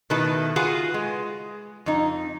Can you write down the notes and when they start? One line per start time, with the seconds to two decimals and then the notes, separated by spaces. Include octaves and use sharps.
0.10 B2 D#3 A3 E4 B4 A5
0.56 F4 F#4 G#4 B4
0.94 G#3
1.86 F2 D#4